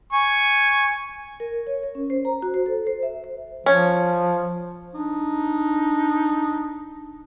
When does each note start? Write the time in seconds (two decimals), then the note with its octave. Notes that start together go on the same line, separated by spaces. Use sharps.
0.13 G#5 C#6
1.40 A#4
1.67 C#5
1.83 A#4
1.95 C#4
2.10 C5
2.25 A#5
2.42 F#4
2.54 C5
2.66 A4
2.87 C5
3.03 E5
3.24 C5
3.66 F3 C#4
4.95 D4 D#4